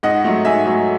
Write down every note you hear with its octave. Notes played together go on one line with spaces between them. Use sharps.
G#2 D#5 F#5
F#3 A3
G#2 E5 G#5
F#3 A3